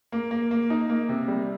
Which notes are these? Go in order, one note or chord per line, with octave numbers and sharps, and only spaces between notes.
A#3
A#3
A#3
D#4
A#3
C3
G3